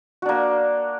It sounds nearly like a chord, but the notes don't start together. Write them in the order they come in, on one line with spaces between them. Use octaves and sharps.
F#4 D4 A#3